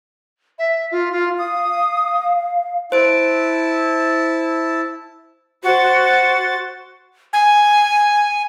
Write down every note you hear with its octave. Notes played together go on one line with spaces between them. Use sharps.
E5
F4
F4
F5 D#6
E4 C5 A5 D7
F#4 C5 A6
G#5